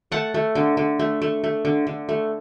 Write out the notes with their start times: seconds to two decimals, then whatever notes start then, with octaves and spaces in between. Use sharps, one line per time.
0.12 A3 F#5 A5
0.34 A3
0.55 D3
0.77 D3
0.99 A3
1.22 A3
1.44 A3
1.65 D3
1.87 D3
2.09 A3